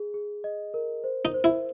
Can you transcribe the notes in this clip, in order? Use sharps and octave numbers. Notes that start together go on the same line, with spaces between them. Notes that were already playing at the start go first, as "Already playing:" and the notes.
Already playing: G#4
G#4
D#5
A#4
C5
D#4
C5
E4